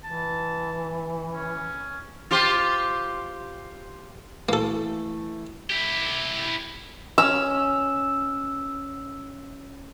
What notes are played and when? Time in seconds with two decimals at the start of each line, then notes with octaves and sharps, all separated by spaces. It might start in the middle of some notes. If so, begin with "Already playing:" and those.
0.04 E3 A5
1.33 C#4
2.31 F4 G4 C5
4.49 E3 A3 A#3 A4
5.70 E4 G4
7.18 C#4 E6